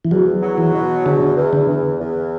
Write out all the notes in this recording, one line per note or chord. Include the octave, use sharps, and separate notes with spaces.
E3
E2 F#3
F#3
E3
B2
E2 D3
E2
D3
E2
E2